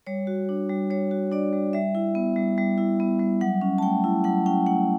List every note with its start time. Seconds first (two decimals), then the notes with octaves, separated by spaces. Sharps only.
0.07 G3 C#5
0.27 F#4
0.49 D4
0.69 G3
0.90 G3 C#5
1.11 F#4
1.31 D4 D5
1.53 G3
1.73 G3 E5
1.95 E4
2.15 B3
2.36 G3
2.58 G3
2.78 E4
3.00 B3
3.20 G3
3.41 F#3 F#5
3.61 C#4
3.78 A5
3.82 A3 G5
4.04 E4
4.24 F#3 F#5
4.46 C#4 G5
4.66 A3 F#5